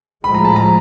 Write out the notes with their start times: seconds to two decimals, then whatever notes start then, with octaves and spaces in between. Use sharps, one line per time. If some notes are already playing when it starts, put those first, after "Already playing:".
0.24 A2 F3 G#3 B5
0.34 A#5
0.45 A5
0.56 A#5